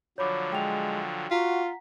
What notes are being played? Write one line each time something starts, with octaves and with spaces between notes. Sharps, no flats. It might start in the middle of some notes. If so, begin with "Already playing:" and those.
D3 F3 F#3 C#5 B5 D6
G#3 G5 F7
F4 F#4 F#5 A#5 B6